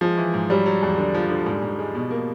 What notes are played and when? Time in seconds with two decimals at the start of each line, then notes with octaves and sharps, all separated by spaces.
0.01 F3 G#3
0.18 E3
0.34 G#2
0.50 F#3 G3
0.66 F#3
0.82 E2
0.98 D3
1.14 F3
1.30 D3
1.46 G#2
1.62 G#2
1.79 G#3
1.95 B2
2.11 A#3